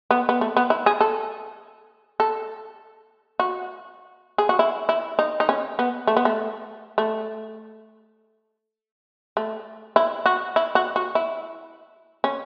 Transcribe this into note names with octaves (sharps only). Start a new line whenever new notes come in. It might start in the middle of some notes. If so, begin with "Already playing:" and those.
B3
B3
A3
B3
E4
G#4
A4
A4
F#4
G#4
F#4
E4
E4
D#4
D#4
C#4
B3
A3
B3
A3
A3
A3
E4
F#4
E4
F#4
F#4
E4
C#4